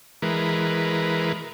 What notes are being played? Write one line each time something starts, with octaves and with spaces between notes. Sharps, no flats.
E3 G#3 A#4 B4